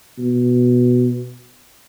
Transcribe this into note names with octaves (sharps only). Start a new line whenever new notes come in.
B2